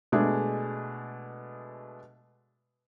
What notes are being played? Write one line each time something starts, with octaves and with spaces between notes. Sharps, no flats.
B2 G#3 A3 D4 G#4